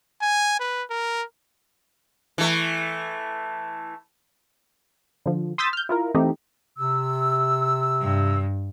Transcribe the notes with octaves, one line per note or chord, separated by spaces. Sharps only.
G#5
B4
A#4
E3 A3
D3 F3
C6 D#6 E6 G6 A6 B6
F6 G6
E4 F4 A#4
E3 A3 C4 D#4 G4
C3 E6
G2